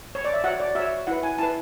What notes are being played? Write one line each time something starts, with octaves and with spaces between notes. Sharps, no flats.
C#5
D5
E5
F#4 C#5 F#5
D5
F#4 C#5 E5
E4 B4 F#5
G#5
E4 B4 A5